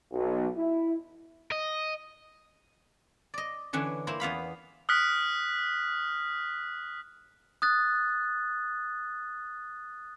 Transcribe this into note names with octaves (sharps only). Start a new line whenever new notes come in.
B1
E4
D#5
D5 D#5
D3 E3 C#4 D4
A#3 E4 C5
E2 B3 F5 B5
D#6 F6 F#6 B6
D#6 F#6 A6